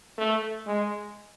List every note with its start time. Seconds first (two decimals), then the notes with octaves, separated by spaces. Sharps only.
0.18 A3
0.67 G#3